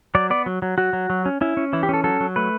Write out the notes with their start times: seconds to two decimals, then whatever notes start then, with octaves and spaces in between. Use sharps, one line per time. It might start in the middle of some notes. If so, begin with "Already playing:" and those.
0.15 F#3 D5
0.30 B3 D5
0.46 F#3
0.62 F#3
0.78 F#3 F#4
0.93 F#3
1.10 F#3
1.26 C#4
1.41 C#4 E4
1.57 C#4
1.73 E3 E4
1.83 G4
1.89 C#4 A4
2.04 F#3 A4
2.21 F#3
2.36 A3 B4